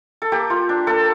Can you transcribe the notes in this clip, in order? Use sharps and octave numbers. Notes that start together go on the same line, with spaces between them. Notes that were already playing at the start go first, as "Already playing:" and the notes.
A4
A#3 G4
F4
D4
A#3 A4